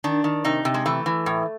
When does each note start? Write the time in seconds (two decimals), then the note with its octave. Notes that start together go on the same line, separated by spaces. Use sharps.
0.04 D#3 D4
0.24 D#3
0.45 C3 D#4
0.65 C3
0.74 G#3
0.86 E3 A3
1.06 E3
1.26 A2